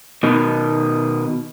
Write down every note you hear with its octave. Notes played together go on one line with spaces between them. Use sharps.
B2 D#3